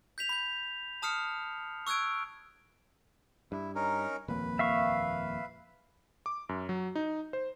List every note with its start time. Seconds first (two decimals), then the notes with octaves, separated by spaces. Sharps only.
0.18 G6 B6 F7
0.29 B5 G6
1.02 A5 D#6 F6 C7 C#7
1.87 C#6 E6 F#6 G#6 D7
3.52 G2 E4
3.75 C#4 D#4 A#4
4.28 D#1 F2 A#3 B4
4.59 E5 F5 C#6
6.26 D6
6.49 F#2
6.69 F#3
6.95 D#4
7.33 C5